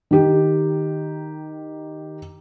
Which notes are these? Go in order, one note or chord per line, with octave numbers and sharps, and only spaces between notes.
D#3 G4